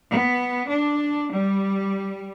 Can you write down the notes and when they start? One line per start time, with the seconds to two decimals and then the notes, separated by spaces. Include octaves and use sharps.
0.11 B3
0.68 D4
1.31 G3